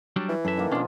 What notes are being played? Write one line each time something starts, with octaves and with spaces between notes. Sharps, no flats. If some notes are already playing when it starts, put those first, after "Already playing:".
F#3 G3 D4
E3
F#2 A4 E5
D#3 A#3
B2 F3 C#4 D4